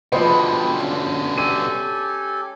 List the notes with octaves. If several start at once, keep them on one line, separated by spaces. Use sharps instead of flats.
B2 D3 F3 G3 G#3 B3 C5 A5
C#4
G4 A4 G#5 D#7